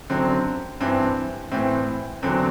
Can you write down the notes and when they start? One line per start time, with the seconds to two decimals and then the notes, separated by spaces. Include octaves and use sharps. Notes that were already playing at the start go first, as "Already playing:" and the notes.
0.10 F#2 D3 F#3 C4
0.80 G2 E3 C4
1.51 A2 E3 C4
2.22 E2 D3 F#3 C4